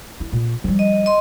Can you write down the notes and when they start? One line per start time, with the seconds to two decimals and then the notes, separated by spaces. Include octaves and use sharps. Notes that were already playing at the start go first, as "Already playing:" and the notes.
0.20 E4
0.32 A#2
0.64 F3 G3
0.79 D#5
1.06 D#5 C6